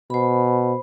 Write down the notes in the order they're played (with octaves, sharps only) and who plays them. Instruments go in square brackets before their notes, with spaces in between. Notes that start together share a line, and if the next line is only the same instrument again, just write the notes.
[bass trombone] B2 [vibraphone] C5 B5